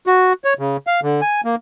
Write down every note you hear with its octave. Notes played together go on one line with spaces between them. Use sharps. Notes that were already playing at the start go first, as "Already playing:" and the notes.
F#4
C#5
C#3
F5
D3
G#5
A#3